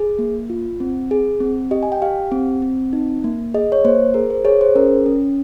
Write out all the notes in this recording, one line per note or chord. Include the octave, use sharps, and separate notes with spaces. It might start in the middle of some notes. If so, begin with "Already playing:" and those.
Already playing: G#4
A#3
F4
C4
G#4
C4
G4 D#5
G#5
G5
G4 F5
C4
C4
D#4
A#3
G#4 D#5
C#5
A#3 C5
G#4 A#4
C5
G#4 C#5
C5
C#4 A#4
C#4